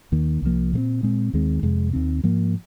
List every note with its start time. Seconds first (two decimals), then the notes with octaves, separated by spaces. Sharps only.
0.12 D#2 D#3 A#3
0.42 C2 C3 F3 A#3
0.73 A#2 G#3 C4
1.03 A#2 G#3 C4
1.33 D#2 D#3 G#3 C4
1.63 F2 C3 G#3
1.93 D#2 D#3 C4
2.24 G#2 F3 A#3